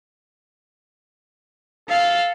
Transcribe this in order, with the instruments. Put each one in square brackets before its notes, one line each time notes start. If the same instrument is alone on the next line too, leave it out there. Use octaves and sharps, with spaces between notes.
[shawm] A4 [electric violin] F5